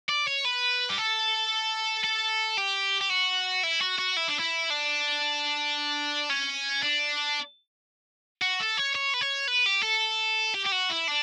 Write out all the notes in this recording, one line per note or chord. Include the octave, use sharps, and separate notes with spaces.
D5
C#5
B4
G4
A4
A4
G4
G4
F#4
E4
F#4
F#4
E4
D4
E4
D4
C#4
D4
F#4
A4
C#5
C#5
B4
C#5
B4
G4
A4
G4
G4
F#4
E4
D4